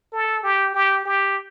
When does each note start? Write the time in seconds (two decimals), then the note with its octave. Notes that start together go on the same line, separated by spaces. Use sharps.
0.12 A4
0.43 G4
0.74 G4
1.05 G4